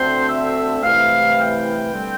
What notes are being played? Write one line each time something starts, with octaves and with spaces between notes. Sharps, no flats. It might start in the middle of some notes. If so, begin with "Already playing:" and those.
Already playing: D2 D3 A3 C4 C5
E5
C2 C3 E3 A3 F5
G5
D3 G3 C4